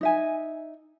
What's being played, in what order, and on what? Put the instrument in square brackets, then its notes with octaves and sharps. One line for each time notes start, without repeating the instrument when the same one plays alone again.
[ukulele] D#4 E5 G#5